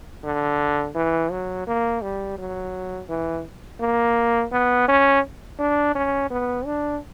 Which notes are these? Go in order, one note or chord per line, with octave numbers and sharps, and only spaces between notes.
D3
E3
F#3
A#3
G3
F#3
E3
A#3
B3
C#4
D4
C#4
B3
D4